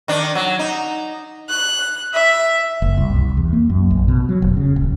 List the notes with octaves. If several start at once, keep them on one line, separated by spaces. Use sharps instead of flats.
D#3 D4
F#3
D#4
F#6
E5
F#1
C2
C2
E2
A#3
F#2
A#1
B2
F#3
F1
C#3
D#1